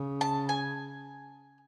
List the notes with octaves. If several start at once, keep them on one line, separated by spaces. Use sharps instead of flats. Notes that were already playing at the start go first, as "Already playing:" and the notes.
Already playing: C#3
A5
G#5